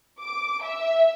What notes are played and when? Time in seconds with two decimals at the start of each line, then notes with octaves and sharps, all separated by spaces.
0.21 D6
0.63 E5